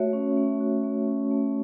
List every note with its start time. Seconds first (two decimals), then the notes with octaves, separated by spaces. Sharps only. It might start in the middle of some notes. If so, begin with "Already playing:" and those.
Already playing: A3 F#4 C#5 E5
0.13 C#4
0.37 A3
0.60 F#4
0.84 A3
1.08 C#4
1.31 A3